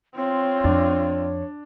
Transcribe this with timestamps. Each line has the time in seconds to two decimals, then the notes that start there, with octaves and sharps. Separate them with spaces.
0.16 C4 F4 C#5
0.64 F2 D4